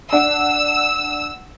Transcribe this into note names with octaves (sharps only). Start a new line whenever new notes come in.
D4 F#5 E6